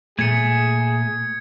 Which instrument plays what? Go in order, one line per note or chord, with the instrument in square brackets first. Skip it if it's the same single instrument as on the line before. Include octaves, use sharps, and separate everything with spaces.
[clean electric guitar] A#2 A3 [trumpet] G#4 [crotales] G#6 C#7